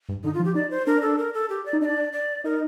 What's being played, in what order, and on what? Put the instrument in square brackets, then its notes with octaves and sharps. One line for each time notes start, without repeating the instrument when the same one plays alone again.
[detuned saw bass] G2
[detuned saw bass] D3 [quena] D#4
[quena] F4
[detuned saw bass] F3
[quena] G4
[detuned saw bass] D#4 [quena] D5
[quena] C5
[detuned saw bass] D4 [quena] A#4
[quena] A4
A#4
A4
G4
D5
[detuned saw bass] D#4
[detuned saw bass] D4 [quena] D5 D#5
[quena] D5
[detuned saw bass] D#4 [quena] A#4